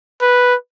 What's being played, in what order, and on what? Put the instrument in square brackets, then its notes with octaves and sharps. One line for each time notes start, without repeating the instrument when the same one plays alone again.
[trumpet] B4